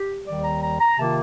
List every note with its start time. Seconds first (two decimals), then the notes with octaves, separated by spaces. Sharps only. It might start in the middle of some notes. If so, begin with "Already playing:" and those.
Already playing: G4
0.27 D#2 D#3 G3 D5
0.44 A#5
0.62 A#5
0.80 A#5
0.98 C3 D#3 A#3 F4 A5